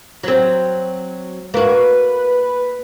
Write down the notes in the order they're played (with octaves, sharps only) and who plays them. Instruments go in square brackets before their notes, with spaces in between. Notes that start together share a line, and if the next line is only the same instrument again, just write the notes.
[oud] F#3 C4
[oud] A#3 F#4 [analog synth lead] B4